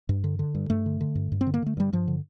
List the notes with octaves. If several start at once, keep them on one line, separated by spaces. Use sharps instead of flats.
G2
D3
D3
G2
G2 A3
D3
D3
G2
G2
C4
D3
A#3
D3 A3
G2 G3
G2 F3
D3